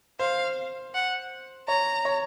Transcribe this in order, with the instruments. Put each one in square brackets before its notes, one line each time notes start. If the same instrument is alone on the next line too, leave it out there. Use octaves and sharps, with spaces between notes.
[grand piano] C5 [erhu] F5
[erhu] F#5
[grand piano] C#5 [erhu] A#5
[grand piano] C#5